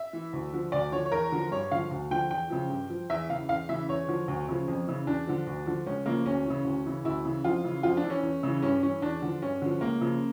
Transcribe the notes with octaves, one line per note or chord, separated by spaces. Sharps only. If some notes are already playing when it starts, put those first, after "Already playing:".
Already playing: E5
E3
D2
D3 F3
D2 D5
D3 F3 C#5
C#5
E2 A#4
D3 F3
G2 C#5
D3 F3 F5
D2
D3 F3 G5
E2 G5
C#3 F3
G2
F3
E2 E5
C#3 E3 F5
E2 F5
C#3 E3 E5
E2 C#5
D3 F3
D2
C#3 F3
F2
C#3 E3
E2 D4
D3 F3
D2
D3 F3
C#2 C#4
C#3 F3 A#3
D2 C#4
E3
C#3
D2
C#3 E3
D2 E4
C#3 E3
F2 F4
C#3 E3
F2 F4
D4
E3
C#4
E2
C#3 E3
G2 C#4
E3 C#4
E2 D4
D3 F3
G2 C#4
D3 F3
C#2 A#3
C#3 F3